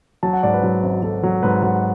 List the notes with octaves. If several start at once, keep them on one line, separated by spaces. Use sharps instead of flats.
F#3 A5
F#5
G#2 D5
B4
F#3
G#1
F#3 A4
F#3
G#2 B4
F#3 F#5